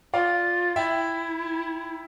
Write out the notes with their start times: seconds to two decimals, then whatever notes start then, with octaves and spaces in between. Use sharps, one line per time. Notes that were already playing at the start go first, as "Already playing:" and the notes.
0.14 F4 D5 F5
0.76 E4 E5 G5